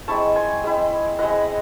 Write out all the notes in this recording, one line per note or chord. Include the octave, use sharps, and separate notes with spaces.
G#3 C4 E4 A5 C#6
G#5 C6
G#3 C4 E4
G#3 C4 E4 D#5 F#5